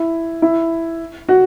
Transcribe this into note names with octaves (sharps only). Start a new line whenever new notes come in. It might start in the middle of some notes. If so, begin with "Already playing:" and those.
Already playing: E4
E4
F#4